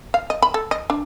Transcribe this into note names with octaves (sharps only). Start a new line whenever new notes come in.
F5
D#5
B5
A4
D#5
D4